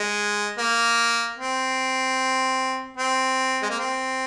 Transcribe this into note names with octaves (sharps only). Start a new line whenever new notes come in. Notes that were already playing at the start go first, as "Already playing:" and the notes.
Already playing: G#3
A#3
C4
C4
G#3
A#3
C4